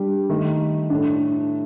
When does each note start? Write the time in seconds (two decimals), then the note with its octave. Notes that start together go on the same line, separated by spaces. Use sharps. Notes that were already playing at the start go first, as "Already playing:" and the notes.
Already playing: G3 D4 G4
0.30 D#3 A3 D#4
0.90 A2 A3 D4